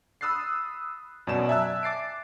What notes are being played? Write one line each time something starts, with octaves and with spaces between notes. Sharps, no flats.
B5 D#6 E6 F#6 A6 C7
F#2 B2 F#3 D5 A5 E7
D5 E5 G#5 A5 E6 F#6
D6 A6 C7 D7